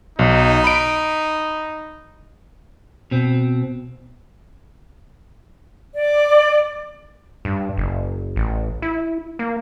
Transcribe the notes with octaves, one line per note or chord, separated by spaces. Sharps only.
B1 D#4
B5 D7
B2 C4
D5
G2
F#1
A1
E4
A#3